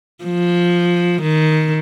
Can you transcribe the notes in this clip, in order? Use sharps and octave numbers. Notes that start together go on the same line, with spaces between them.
F3
D#3